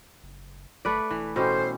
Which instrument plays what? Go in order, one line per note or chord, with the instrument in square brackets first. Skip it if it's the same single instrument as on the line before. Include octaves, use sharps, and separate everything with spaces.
[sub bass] F#1
[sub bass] G1 [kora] A3 B4 D5
[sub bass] E1 [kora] E3
[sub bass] D1 [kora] B2 C#4 G4 [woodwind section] A4 C5